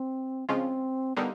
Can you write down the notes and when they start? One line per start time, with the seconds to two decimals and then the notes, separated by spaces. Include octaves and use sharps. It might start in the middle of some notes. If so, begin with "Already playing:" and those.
Already playing: C4
0.49 C#3 F3 G#3 C4 C#4 F4
1.16 D3 G3 A#3 B3 D#4